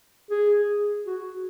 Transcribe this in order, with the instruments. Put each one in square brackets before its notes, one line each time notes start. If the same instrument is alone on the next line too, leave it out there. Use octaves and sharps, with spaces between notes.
[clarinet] G#4
F#4